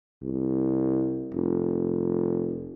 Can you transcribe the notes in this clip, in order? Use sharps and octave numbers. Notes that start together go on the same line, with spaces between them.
C2
F1